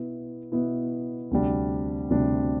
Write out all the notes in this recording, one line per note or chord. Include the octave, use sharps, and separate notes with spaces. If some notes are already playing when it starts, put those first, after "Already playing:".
Already playing: B2 B3 E4
B2 B3 E4
D2 C3 G3 D4
D2 C3 G3 D4